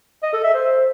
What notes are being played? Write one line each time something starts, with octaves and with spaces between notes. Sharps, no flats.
D#5
A4
E5
C5